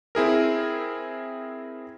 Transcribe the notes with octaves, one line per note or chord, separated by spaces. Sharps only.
C4 E4 G#4 A#4